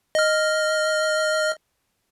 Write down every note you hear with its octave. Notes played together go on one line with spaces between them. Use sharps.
D#5 F6